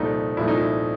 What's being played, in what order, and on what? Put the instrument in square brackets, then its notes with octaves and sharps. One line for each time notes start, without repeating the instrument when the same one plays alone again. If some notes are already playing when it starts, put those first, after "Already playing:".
Already playing: [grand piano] C2 A#2 F3 A3 D#4
C2 A#2 F3 A3 E4
D#4
E4